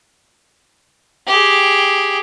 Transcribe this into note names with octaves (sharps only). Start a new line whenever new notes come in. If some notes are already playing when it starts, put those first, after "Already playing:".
G4 G#4